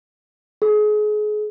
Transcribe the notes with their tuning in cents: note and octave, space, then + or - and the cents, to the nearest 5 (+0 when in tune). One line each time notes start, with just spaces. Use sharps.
G#4 +30